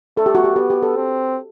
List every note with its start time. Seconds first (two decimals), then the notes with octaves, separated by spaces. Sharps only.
0.17 A3 A4
0.26 G4
0.35 F#4
0.44 G4
0.56 B3 G4
0.70 G4
0.83 A4
0.96 C4